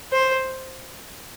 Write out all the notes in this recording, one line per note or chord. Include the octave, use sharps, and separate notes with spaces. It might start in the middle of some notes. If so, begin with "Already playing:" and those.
C5